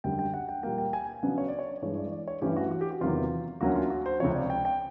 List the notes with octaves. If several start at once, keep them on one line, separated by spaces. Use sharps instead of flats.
F#2 D3 G3 G5
G5
F#5
G5
A#2 G3 A#3 G5
G5
G#5
C#3 F#3 B3 D4 F#5
C#5
D5
C#5
G2 E3 G#3 C#5
D5
D5
C#5
G2 E3 A3 C#4 G4
F#4
F#4
G4
F#4
E2 C3 D#3 F#3 F4
D2 D3 F#3 A#3 C#4 F#4
F4
F#4
C5
C#2 C3 F3 C#5
D5
G5
G5